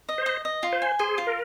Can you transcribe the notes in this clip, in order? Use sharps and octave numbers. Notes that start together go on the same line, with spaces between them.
D#5
C5
D#5
D#5
F4
C5
G#5
G#4 C5
F4
A#4